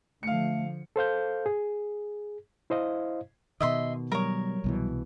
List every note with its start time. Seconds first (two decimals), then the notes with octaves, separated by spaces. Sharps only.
0.23 D3 F3 A3 F5 C#7
0.96 A4 C5 F5 G6
1.46 G#4
2.70 E4 C5 D#5 F5
3.60 B2 D#3 D#5 E5 C6
4.12 F#3 G3 A#4 C#5
4.64 C2 B2 E3